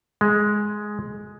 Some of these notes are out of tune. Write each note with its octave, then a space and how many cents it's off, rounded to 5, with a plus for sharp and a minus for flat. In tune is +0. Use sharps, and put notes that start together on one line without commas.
G#3 +5